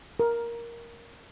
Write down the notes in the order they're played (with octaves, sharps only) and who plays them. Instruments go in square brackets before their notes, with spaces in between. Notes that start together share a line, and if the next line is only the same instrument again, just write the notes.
[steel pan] A#4